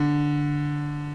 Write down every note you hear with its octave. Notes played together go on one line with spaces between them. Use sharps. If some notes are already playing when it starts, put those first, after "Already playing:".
Already playing: D3